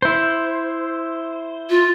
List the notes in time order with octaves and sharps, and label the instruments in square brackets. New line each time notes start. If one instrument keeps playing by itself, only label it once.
[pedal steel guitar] E4 C5
[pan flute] F4